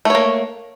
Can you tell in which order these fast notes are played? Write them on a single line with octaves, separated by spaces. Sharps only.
A3 C#5 A#3